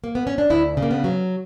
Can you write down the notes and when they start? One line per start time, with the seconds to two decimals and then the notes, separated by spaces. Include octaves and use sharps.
0.04 A#3
0.15 B3
0.27 C#4
0.38 D4
0.50 D2 E4
0.77 C#3
0.83 A#3
0.91 B3
1.04 F#3